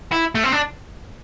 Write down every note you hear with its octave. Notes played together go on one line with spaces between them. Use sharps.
E4
A3
C4
D4